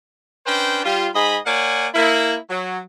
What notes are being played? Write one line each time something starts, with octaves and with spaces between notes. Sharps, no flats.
C#4 D4 B4 C5 G5
G3 F4
G#2 G#4 D#5 B5
A#3 C#5 D5 F#5 G#5
A#3 E4
F#3